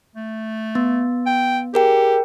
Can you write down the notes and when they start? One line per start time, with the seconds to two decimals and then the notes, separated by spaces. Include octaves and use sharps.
0.16 A3
0.75 B3
1.26 G5
1.74 G4 G#4 A#4 G5